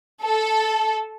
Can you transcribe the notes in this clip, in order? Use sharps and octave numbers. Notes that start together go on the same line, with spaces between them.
A4